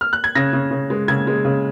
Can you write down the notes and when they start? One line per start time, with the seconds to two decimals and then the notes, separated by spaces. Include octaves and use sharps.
0.01 F6
0.13 F#6
0.24 G#6
0.35 C#3 A#6
0.53 C#3
0.71 C#3
0.90 G#3
1.08 C#3 G#6
1.27 G#3
1.45 C#3